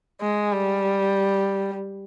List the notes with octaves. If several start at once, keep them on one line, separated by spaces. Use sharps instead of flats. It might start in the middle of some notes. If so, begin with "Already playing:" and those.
G#3
G3